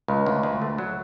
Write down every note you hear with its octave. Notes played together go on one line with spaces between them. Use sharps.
C#2
D2
D2
A3
F#3